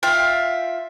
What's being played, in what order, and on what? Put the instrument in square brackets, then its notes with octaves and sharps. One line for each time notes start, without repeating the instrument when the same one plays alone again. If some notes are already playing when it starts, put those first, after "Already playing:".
[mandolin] F4 E5 F5 G5